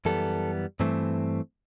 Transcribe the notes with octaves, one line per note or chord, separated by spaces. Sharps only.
F#2 E3 G3 B3 A4
G2 E3 A3 C4